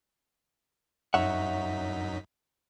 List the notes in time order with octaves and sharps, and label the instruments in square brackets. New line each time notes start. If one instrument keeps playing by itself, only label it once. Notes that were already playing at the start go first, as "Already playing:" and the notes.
[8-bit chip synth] F#2 D#4 B6 [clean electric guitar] C#5 E5 F#5